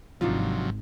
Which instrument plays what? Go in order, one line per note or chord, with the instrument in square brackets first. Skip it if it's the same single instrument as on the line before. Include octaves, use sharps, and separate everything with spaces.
[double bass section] G#1 [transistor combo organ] C3 F3 F#3 [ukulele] D4 D#4 F4